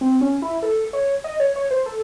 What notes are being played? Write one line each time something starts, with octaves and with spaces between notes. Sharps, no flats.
C4
C#4
E4
A4
C#5
D#5
C#5
C#5
C5
A4